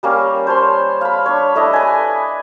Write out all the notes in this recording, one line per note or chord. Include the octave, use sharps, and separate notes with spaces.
G3 A#3 C#4
C5 C#5 A5 C6
F5 B5
D4 C#5
A3 D4 E4 D#5
B4 G#5